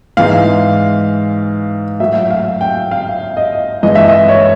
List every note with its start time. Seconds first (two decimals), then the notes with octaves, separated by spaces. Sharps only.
0.17 G#2 E3 G#3 F5
2.00 A2 F#3 E5
2.30 F5
2.61 G5
2.91 F5
3.37 D#5
3.83 G2 E3 G#3 D#5
3.95 E5
4.08 D#5
4.29 C#5